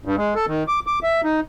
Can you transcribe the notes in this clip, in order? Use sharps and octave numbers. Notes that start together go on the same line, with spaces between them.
G2
G#3
A4
D#3
D6
D6
E5
D#4